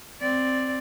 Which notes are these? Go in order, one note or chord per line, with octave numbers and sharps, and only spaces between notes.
C4 D5